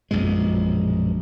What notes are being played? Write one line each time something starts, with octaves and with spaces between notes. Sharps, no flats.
A#1 F#2 B2 G#3